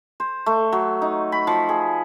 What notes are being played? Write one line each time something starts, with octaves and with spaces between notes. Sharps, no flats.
C5
A3
F#3
D#4
B5
F3
G#4